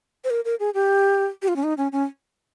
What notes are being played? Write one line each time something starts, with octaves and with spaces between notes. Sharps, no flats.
C5
A#4
A#4
G#4
G4
G4
F4
C#4
D#4
C#4
C#4